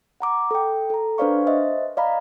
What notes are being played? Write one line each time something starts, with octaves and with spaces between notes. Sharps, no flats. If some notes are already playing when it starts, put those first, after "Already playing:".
F#5 A#5 D6
A4 G5
A4 A#5
D4 B4 C5 D5 F5 C#6
C5 D#5 E5
D5 D#5 F5 A#5 B5